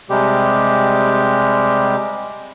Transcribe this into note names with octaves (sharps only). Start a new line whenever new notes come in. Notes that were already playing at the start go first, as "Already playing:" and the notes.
C3 G3 G#3 G4